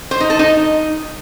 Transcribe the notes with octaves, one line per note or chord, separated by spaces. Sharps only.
C5
D#4
A4
D#4